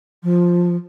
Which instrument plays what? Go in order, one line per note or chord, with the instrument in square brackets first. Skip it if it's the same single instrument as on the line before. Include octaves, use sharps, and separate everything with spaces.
[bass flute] F3